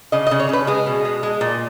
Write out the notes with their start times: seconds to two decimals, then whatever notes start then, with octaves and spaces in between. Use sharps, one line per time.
0.12 C#3 D#5
0.27 D#5
0.31 C#3
0.40 C#5
0.49 C#3 B4
0.67 G#3 G#4
0.86 B2
1.05 G#3
1.23 G#3
1.41 A#2